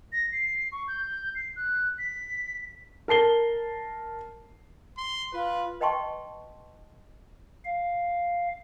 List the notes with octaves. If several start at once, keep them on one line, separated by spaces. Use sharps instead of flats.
A#6
C7
C#6
G6
C7
F#6
B6
A#4 A5 C7 G7
C6
F4 B4
B4 D#5 G5 A5 C6 C#6
F5